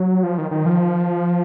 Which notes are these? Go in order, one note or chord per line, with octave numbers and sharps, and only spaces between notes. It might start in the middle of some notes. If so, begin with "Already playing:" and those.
Already playing: F#3
F3
D#3
D#3
F3